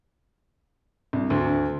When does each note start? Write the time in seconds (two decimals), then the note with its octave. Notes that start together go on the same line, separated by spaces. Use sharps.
1.13 C2
1.30 D2